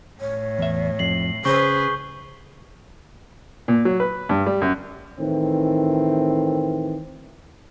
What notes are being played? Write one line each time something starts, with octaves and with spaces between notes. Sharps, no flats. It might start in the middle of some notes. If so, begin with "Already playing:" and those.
A2 C#5
E2 E5
F2 C7 F#7
C#3 G#4 B4 C5 C#6 G6 G7
A#2
F#3
B4
G2
G3
F#2
A2 D#3 E3 C4